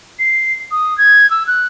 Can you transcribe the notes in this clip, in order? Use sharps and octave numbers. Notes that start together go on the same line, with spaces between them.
C7
D#6
G#6
E6
F#6